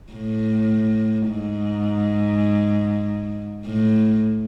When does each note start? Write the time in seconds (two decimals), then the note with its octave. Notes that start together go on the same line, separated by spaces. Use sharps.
0.12 A2
1.30 G#2
3.66 A2